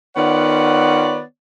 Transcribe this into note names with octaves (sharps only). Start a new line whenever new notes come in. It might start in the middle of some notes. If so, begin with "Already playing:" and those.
D#3 B3 F4 C#5 D5 F#5